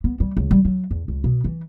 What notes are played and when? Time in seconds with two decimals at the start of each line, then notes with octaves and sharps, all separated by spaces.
0.04 B3
0.20 G3
0.37 C#2
0.51 G3
0.65 F#3
0.91 E2
1.08 C#2
1.24 B2
1.44 E3